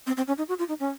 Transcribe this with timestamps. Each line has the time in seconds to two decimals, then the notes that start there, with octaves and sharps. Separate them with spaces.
0.07 C4
0.17 C4
0.28 C#4
0.38 D#4
0.49 F#4
0.59 F4
0.69 D#4
0.80 C#4